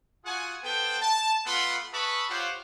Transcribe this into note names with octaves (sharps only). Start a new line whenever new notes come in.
F4 F#4 G#4 F#5 G#5
B3 A4 C5 G5
A5
A3 B3 F4 F#5 B5 C6
G#4 B4 E5 A5 B5 C#6
F4 G4 C5 C#5 F5 F#5